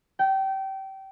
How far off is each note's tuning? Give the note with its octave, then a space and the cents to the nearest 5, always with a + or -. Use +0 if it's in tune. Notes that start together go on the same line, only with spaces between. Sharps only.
G5 -25